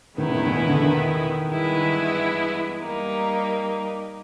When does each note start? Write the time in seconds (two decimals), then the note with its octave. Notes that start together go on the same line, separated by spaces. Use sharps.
0.18 E2 B2 D#3 G#3 B3 E4
0.29 D3
0.35 D#3
0.45 D#3
0.51 E3
0.68 D3
0.83 D#3
1.49 G2 E3 G#3 B3 E4
2.80 G3 A#3 D#4